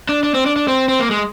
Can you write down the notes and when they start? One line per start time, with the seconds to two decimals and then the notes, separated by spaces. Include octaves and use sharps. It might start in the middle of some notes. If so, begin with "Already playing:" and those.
0.09 D4
0.23 D4
0.34 C4
0.46 D4
0.56 D4
0.68 C4
0.88 C4
1.00 A#3
1.11 G#3